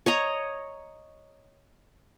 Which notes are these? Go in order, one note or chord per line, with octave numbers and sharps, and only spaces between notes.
C#5 D#5 A#5